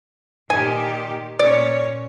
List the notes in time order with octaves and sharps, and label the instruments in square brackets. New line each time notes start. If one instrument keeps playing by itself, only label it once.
[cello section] A#2 D#3 G4 [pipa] G#5
[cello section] A#2 C#4 C#5 [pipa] D5